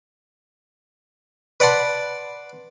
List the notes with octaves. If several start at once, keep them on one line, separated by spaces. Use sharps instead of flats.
B4 D5 F#5 A5 C6